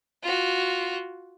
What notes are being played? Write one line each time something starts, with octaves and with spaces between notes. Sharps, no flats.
F4 F#4